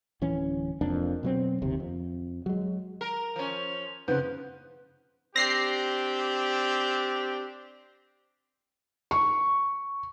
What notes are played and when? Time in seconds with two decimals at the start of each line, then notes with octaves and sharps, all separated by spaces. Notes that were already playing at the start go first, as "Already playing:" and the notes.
0.21 D1 E3 C#4
0.81 F1 F2 A#3 D4
1.23 B2 F#3 C4
1.62 F#1 D#2 C3
1.80 F2
2.46 F#3 G#3
3.01 A#4
3.36 F3 C#4
4.08 C#3 F3 B4 F#5 G6
5.36 C4 D4 G4 A#6 C7
9.11 C#6